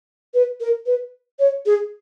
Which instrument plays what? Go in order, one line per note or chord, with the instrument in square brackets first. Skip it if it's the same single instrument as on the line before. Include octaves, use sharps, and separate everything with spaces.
[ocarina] B4
A#4
B4
C#5
G#4